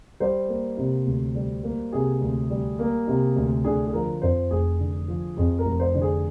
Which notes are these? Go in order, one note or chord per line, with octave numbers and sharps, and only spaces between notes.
G3 C5
A#3
C3
D2
G3
A#3
C3 G#4
D2
G3
A#3
C3
D2
D3 G#4
G#4
F3 A#4
F2 C5
F1 G#4
D3
F3
F2 G#4
A#4
F1
C5
D3
G#4